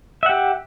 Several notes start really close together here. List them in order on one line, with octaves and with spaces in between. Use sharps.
E5 F#5 G4